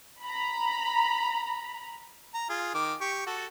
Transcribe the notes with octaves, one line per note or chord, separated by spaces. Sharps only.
A#5 B5
A#5
F4 G#4
D#3 D6
G4 C#6
F#4 A4